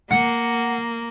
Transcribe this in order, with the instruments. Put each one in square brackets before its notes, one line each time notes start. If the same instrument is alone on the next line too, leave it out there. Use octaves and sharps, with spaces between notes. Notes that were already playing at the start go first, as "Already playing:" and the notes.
[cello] A#3 [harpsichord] F#5